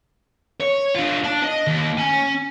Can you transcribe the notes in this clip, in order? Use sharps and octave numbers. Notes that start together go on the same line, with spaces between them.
C#5
D4 F4
D4 A5
D#5
D#2
C#4 G#5